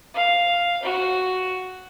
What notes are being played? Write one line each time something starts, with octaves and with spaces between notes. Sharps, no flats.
F5
F#4